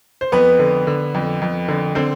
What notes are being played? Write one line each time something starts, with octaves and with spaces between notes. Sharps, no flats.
C5
F2 B3 B4
D3
D3
F2
F2
D3
D3 C4 C5